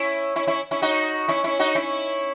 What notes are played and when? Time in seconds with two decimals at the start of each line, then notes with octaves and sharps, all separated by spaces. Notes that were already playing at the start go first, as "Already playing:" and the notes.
Already playing: C#4 E4
0.36 C#4 E4
0.47 C#4 E4
0.71 C#4 E4
0.82 D#4 F#4
1.28 C#4 E4
1.44 C#4 E4
1.59 D#4 F#4
1.75 C#4 E4